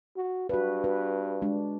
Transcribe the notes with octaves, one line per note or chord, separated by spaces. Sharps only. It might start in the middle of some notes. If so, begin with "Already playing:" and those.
F#4
G2 F#4 B4
F#4 B4
G#3 D4